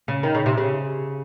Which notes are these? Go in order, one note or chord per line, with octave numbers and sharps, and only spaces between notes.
C#3
D#3
C#3
C3
C#3